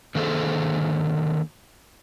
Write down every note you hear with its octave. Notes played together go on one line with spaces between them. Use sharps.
D3 D#3 A#3 G#4 A4 C5